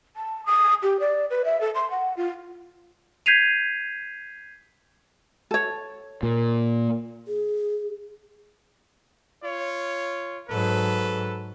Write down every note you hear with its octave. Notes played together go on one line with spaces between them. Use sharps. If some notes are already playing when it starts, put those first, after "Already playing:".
A5
D#6
G4
D5
B4
E5
A4
C6
F#5
F4
G6 G#6 B6 C7 D#7 F7
A4 C#5
A#2
G#4
F4 C#5
G#2 F#3 A4 B4